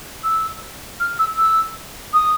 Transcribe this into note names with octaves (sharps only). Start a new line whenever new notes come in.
E6
F6
E6
E6
D#6